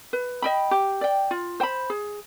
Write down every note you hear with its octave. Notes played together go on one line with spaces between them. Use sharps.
B4
D#5 G5 B5
G4
D5 G5
F4
C5 G5 B5
G#4